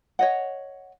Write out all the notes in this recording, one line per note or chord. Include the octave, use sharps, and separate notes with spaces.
C#5 D#5 F#5